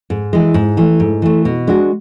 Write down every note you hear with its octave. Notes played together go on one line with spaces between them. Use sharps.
G#2
E3 G#3
G#2
E3 A3
G#2
E3 A3
B2
G#3 D4 F#4